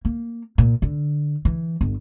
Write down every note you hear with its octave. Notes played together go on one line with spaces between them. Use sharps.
A#3
A#2
D3
E3
G1